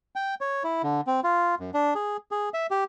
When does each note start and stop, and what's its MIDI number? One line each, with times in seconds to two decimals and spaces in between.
0.16 0.35 79
0.41 0.63 73
0.64 0.82 64
0.83 1.01 50
1.07 1.20 60
1.24 1.55 65
1.60 1.70 42
1.74 1.94 62
1.95 2.17 68
2.31 2.49 68
2.54 2.67 76
2.71 2.84 67